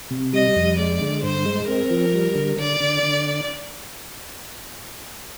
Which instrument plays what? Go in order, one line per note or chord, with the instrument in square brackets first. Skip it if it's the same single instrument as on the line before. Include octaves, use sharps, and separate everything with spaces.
[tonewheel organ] C3
[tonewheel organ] G3 [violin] D#5
[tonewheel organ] F2
[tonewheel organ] G#3 [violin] D5
[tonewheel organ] D3
[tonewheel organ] G2 [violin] C5
[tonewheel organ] G#3
[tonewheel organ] C4 [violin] A#4
[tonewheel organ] F3
G3
D3
[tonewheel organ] D3 [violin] D5
[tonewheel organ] D3
D3